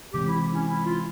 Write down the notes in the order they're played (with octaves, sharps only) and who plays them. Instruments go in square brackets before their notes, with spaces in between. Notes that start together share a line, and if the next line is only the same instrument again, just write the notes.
[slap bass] C3 E3 G#3 C4 [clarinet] G4
[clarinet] E4
E4
C#4
E4
F4